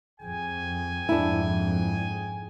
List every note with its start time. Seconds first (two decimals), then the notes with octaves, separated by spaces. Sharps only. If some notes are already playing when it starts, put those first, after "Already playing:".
0.21 F2 G#4 G5 G#5
1.09 F2 G#2 D4 E4